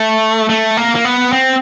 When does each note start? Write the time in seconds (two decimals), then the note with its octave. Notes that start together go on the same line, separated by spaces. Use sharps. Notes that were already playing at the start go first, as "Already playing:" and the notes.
Already playing: A3
0.49 A3
0.77 A#3
0.95 A#3
1.05 B3
1.33 C4